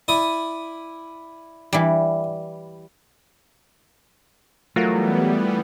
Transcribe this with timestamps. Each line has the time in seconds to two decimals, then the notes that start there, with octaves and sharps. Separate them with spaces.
0.08 E4 D5 D#6
1.73 E3 G3
4.76 E3 F#3 G3 A3 B3 F4 F#4 A#4